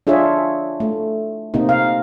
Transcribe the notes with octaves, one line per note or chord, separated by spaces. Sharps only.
D4 F4 G#4 C#5 E5
A3
C3 A#3 C4 D#4
F5